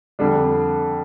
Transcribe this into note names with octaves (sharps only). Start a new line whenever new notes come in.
F2 D3 G3 D4